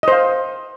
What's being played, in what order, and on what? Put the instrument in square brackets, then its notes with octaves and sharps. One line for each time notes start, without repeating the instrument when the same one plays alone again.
[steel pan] D#5
C5
F5